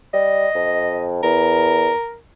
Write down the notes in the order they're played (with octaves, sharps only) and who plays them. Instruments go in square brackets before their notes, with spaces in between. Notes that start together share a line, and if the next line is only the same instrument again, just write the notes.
[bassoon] G3 [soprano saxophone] D#5
[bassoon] F2
[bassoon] E2 [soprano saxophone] A#4